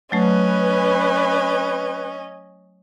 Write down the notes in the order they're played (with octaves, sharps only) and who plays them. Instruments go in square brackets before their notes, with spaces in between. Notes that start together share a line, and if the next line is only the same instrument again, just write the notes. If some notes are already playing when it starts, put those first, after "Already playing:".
[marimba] F#3 A3 [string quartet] C#4 D#5 [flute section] B4